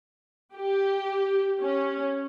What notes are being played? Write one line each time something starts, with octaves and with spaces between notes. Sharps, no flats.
G4
C#4